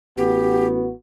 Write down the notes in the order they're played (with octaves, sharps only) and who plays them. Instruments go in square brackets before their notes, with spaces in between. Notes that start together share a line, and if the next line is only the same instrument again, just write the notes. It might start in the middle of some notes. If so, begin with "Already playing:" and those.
[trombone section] A1 B3 F#4 [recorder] G4